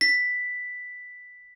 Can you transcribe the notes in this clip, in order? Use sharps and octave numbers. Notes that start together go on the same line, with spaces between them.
B6